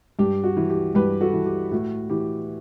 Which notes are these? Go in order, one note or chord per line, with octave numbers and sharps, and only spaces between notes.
G2 G4
F#4
E3
G4
G2 G4 B4
F#4 A4
E3
G4
A2 F#4
E3 G4